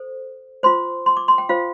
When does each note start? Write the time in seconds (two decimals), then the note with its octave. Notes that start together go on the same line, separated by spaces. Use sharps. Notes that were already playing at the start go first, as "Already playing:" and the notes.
Already playing: A4 C5
0.63 F4 C5 C6
1.06 C6
1.17 D6
1.28 C6
1.38 G5
1.49 F4 C5 F5